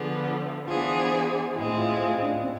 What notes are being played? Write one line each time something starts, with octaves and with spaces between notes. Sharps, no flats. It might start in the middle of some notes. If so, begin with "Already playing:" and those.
Already playing: D3 F3 B3 G#4 A4
E3 B3 D4 F4 G#4 C5
A2 G#3 C4 E4
F4
F4
D4
C4